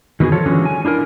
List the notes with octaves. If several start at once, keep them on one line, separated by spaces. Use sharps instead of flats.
D#3 F#3 B3 F#4 G#4
F3 F4 A4 C#5
D3 E3 F#3 G#3 C#4
G#5
D4 E4 F4 A#4